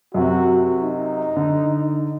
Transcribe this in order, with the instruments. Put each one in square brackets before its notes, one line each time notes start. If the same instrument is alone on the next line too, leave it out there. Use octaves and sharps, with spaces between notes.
[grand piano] F#2 C3 [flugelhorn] F#4
[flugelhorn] D#4
[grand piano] D3